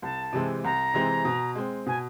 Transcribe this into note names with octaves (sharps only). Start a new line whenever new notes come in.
C2 A5
C3 E3 G#3 C4
C2 A#5
C3 E3 G#3 C4
B2
G#3 C4
B2 G#5